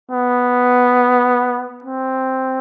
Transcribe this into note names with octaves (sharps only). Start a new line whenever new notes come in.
B3
C4